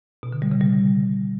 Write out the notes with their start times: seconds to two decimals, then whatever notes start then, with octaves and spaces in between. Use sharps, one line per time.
0.23 B2
0.33 D3
0.42 G3
0.52 C#3
0.61 G3